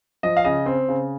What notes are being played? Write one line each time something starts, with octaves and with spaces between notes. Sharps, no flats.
F3 D#5
F5
C#3 D#5
C4
C#3